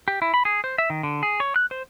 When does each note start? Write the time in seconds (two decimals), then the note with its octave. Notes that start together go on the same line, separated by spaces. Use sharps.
0.08 G4
0.22 E4
0.34 B5
0.45 G#4
0.64 C5
0.78 E5
0.90 D#3
1.03 D3
1.23 G#4
1.40 C#5
1.56 F#6
1.71 C5